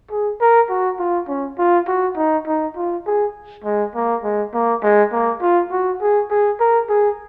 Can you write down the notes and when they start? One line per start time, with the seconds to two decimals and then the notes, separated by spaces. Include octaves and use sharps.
0.11 G#4
0.41 A#4
0.69 F#4
0.99 F4
1.28 C#4
1.58 F4
1.88 F#4
2.17 D#4
2.47 D#4
2.76 F4
3.06 G#4
3.64 G#3
3.95 A#3
4.24 G#3
4.54 A#3
4.83 G#3
5.12 A#3
5.42 F4
5.71 F#4
6.01 G#4
6.30 G#4
6.60 A#4
6.89 G#4